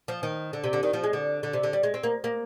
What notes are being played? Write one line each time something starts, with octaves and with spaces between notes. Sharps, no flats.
F3
D#3
D3
C3
D3
D#3
F3
G#3
D3
D3
C3
D3
G3
G#3
C4
A#3
A#3